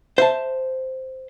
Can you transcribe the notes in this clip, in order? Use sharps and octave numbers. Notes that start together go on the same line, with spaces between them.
C5 E5 A5